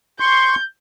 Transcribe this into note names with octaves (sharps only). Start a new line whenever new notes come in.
C6 C#6 G6